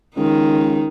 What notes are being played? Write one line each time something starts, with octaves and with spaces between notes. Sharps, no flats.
C#2 D#3 D#4